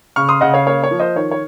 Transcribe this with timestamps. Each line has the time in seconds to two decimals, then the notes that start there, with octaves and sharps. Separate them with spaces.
0.16 C#3 C#6 F6
0.29 C6 D#6
0.41 C#3 D#5 F#5
0.54 C#5 F5
0.67 A#3 C#5 F5
0.84 C#5
0.91 F3
0.99 C5 D#5
1.16 D#3 C#5
1.31 C#5